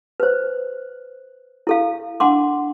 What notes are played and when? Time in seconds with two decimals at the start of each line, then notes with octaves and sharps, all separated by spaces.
0.20 B4 C5
1.67 E4 A4 F5
2.20 D4 F#5 C6 D6